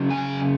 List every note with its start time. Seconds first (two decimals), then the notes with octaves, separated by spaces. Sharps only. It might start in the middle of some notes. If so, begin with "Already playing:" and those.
Already playing: C#3 F#3 C#4
0.10 G#5